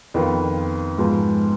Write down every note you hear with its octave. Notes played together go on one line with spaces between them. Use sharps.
F2 D#3 B3 F4
G#2 F3 B3